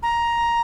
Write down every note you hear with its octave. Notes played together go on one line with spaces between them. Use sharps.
A#5